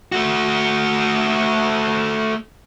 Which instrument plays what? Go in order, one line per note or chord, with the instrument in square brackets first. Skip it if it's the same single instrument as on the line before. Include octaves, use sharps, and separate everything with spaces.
[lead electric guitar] A3 F#4